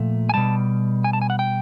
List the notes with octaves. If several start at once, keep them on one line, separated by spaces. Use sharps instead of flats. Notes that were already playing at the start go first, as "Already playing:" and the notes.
Already playing: A#2 F3 A3
G#5
B2 G3 A5
G#5
A5
G#5
F#5
G5